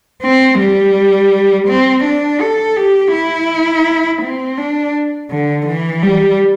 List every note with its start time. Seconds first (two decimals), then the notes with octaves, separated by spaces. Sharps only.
0.22 C4
0.60 G3
1.68 C4
2.04 D4
2.40 A4
2.76 G4
3.13 E4
4.22 C4
4.57 D4
5.30 D3
5.67 E3
6.02 G3